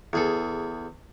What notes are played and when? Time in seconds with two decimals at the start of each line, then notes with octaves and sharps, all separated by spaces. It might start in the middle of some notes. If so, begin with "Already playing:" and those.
0.13 E2 G#4 A4